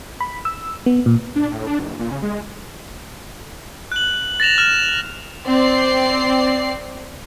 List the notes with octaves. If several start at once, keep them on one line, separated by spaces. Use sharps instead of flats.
B5
E6
B3
A#2
D4
A2
D4
F#1
A#2
C#3
G#3
F#6 F#7
A6 A#6 E7 F7
F6 E7
C4 D5 C7